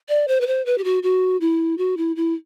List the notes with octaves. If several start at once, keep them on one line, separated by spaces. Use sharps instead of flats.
D5
C5
B4
C5
B4
G4
F#4
F#4
E4
F#4
E4
E4